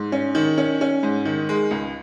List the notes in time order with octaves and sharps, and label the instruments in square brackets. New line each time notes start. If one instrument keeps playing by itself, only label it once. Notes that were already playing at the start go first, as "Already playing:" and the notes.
Already playing: [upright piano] G#2
C#4
D#3
C#4
C#4
G#2
D#3
G#3
C#2